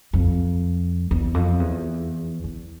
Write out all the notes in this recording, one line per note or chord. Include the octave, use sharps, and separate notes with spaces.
F2
E2
F2
E2
E2